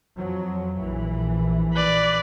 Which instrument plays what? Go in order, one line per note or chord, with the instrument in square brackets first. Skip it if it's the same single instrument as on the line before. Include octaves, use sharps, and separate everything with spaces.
[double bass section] F2 F3 F#3
A#1 E3
[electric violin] B4 D5